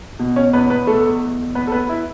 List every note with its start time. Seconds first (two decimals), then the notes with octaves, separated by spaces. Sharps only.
0.19 B2
0.36 C#4 C#5
0.53 E2 B3 B4
0.70 B3 B4
0.87 B2 A3 A4
1.22 E2
1.55 E2 B3 B4
1.67 A4
1.72 B3 B4
1.89 E4 E5